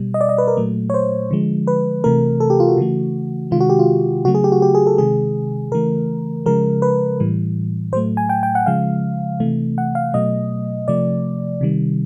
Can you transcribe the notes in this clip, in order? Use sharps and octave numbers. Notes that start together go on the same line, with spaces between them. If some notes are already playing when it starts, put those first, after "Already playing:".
Already playing: B2 G3
D#5
D5
D#5
B4
A#4
A#2 F#3 A3
C#5
C5
D3 F3 G#3
B4
C3 E3 A3 A#4
A4
G4
F4
F#4
C#3 E3 A3
C3 D#3 G#3 F4
F#4
G4
F4
C#3 F#3 A3 F#4
G#4
G4
F#4
G4
G#4
A4
C3 D#3 G#3 G#4
C#3 E3 A3 A#4
C#3 F3 G#3 A#4
B4
A2 E3 G3
A2 F#3 A3 C5
G#5
G5
G5
F#5
C#3 F3 G#3 F5
C3 E3 A3
F#5
F5
B2 F#3 A3 D#5
C3 F3 A3 D5
C3 D#3 G3